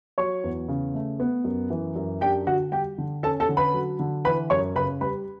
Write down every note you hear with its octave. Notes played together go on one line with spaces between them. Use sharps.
F#3 C#5 C#6
E2
C#3
A3
B3
F#2
E3
F#2
D4 G4 G5
D3 F#4 F#5
G3 G4 G5
D3
C#4 A4 A5
A4 A5
D3
B4 B5
F#3
D3
E3 B4 B5
F#2 C#5 C#6
C#3 B4 B5
G3 B4 B5